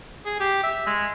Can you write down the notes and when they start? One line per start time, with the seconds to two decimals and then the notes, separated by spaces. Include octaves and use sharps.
0.26 G#4
0.40 G4
0.64 E5
0.87 G#3